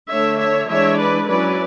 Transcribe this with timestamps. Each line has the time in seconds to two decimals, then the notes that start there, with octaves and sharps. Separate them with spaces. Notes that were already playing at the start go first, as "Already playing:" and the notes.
0.10 D3 A3 D4 C#5 E5
0.39 C#5 E5
0.69 E3 G#3 D4 C#5 E5
0.98 B4 D5
1.28 F#3 C#4 E4 B4 D5